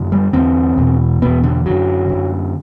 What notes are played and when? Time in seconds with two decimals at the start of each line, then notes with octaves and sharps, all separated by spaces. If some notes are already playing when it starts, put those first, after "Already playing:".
Already playing: F#2 D3
0.12 G3
0.33 E2 D3 C4
0.78 E2 B2
1.22 E2 B2 B3
1.44 D3
1.66 F#2 D3 F#3
2.09 F#2 D3